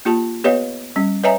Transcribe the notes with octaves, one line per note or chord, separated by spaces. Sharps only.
A#3 F4 G4 A5
B3 G4 B4 C#5 D#5 F5
G3 C#4
B4 C#5 D#5 E5 G#5 A#5